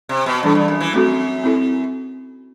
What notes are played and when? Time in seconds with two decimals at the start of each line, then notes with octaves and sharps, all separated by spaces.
0.09 C3
0.26 B2
0.43 A2 E3 G3 D4 A4
0.55 G2
0.68 F#2
0.81 E3
0.93 F#2 A3 C4 F#4 A4
1.44 C4 E4 A4